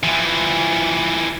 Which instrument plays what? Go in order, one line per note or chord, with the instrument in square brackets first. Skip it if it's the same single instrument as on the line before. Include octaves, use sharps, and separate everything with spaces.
[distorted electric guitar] E3 F3